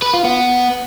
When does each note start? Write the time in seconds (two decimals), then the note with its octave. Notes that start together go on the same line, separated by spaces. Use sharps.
0.02 B4
0.13 F4
0.25 B3